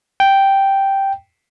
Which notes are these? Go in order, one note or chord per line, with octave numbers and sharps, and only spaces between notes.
G5